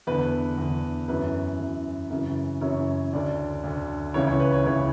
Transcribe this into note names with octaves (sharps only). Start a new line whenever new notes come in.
E2 D3 B4
E2 D3
F#2 E3 B4
F#2 E3
F#2 C#3 E3
F#2 C#3 E3 C#5
D2 D3 D5
D2 D3
C#2 C#3 E3 C#5
C#5
B4
C#5
C#2 C#3 E3 C#5